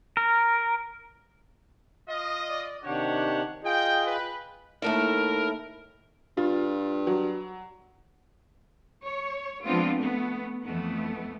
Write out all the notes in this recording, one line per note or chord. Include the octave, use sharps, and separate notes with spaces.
A#4
F4 D#5
D5
C3 D#3 D4 G4 C#5 F#5
F4 G#4 D#5 G5
B4
D#2 A3 E4 A#4
G2 F4
F#3
C#5
F3 G#3 B3 C4 D4 F4
A3 B3
F2 E3 A3 B3